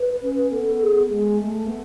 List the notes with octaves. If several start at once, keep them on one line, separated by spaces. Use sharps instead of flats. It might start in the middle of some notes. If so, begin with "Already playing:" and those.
Already playing: B4
C#4
B3 A4
G#4
G#3
A3
B3